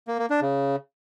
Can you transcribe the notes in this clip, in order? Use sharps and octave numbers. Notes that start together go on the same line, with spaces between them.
A#3
A#3
D4
C#3